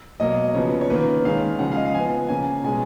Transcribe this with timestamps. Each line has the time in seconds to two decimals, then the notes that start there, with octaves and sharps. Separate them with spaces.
0.20 B2 F#3 A#3 D#5
0.55 C#3 F3 B3 C#5
0.81 C#5
0.90 D#3 A#3 C#4 B4
1.25 D#3 G#3 C#4 F5
1.59 C#3 F3 G#3 F#5
1.72 F5
1.77 D#5
1.85 F5
1.94 F3 B3 G#5
2.29 C#3 F3 A#3 C#4 G#5
2.63 B2 G#3 C#4 G#5